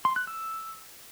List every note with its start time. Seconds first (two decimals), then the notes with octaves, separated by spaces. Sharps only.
0.05 C6
0.16 F#6
0.27 E6